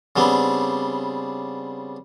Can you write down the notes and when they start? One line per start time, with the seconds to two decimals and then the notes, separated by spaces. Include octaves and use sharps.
0.16 C#3 G3 B3 C4 D4